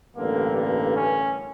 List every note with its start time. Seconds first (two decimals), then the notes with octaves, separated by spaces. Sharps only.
0.16 A1 G2 D3 A#3
0.55 A#3
0.94 C#4